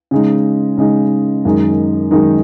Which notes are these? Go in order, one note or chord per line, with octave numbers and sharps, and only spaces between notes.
C#3 G#3 D#4
C#3 G#3 D#4
F#2 D#3 G#3 D#4
F#2 D#3 G#3 D#4